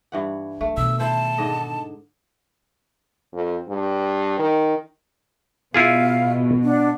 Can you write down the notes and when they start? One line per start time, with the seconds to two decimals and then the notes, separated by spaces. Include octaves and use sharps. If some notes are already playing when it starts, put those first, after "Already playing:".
0.12 G2 E3 F#5
0.61 F#3 A3
0.77 B2 D#3 E6
1.00 E4 C5 A5
1.38 G#2 D3 D#5
3.34 F2
3.69 G2
4.39 D#3
5.74 B2 E4 F4 G#4 F5
6.63 D4 F#5